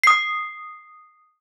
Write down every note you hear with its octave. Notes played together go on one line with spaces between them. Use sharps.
D#6 C7